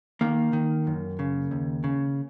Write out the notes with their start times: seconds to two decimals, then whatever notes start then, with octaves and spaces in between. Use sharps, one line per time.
0.21 D#3 A#3
0.53 D#3
0.87 F#2
1.19 C#3
1.51 D#2
1.84 C#3